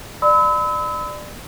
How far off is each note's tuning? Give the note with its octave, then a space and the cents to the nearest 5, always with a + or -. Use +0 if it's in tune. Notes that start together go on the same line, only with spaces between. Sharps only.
D5 +25 B5 +35 E6 -35